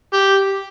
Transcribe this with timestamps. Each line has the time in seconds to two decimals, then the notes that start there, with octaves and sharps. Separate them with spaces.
0.13 G4